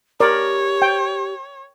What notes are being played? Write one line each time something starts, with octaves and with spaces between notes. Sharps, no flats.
G4 A#4 C#5 D5
G5